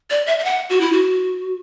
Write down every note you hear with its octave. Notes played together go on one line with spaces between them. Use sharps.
D5
E5
E5
F#5
F#4
E4
F#4